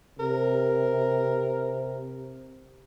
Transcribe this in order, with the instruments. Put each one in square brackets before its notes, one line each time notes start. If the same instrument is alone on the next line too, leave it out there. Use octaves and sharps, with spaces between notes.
[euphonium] C3 [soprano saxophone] A#4